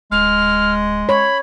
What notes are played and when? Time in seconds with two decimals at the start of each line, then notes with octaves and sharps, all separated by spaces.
0.12 D1 G#3 F6
1.09 C#5 B5